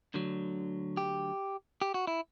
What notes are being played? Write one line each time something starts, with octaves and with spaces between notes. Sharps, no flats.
D2 D3 F#3
G4
G4
F#4
E4